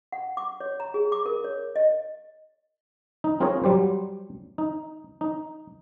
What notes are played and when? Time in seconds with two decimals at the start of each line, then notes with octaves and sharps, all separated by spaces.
0.12 F#5
0.37 D6
0.60 C#5
0.80 A#5
0.94 G#4
1.12 D6
1.26 A#4
1.44 C#5
1.76 D#5
3.24 D#4
3.40 C4 F4 G#4 A#4 C5 C#5
3.64 F#3 G3 G4 C5
4.58 D#4
5.21 D#4